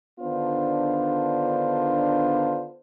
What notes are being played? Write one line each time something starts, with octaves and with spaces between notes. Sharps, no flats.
D3 D#3 B3 D4 F4 C5